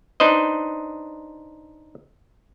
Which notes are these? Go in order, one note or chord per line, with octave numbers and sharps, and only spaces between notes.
D4 D#4 B4 C5 D#5